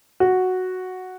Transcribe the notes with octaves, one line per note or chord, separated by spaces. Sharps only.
F#4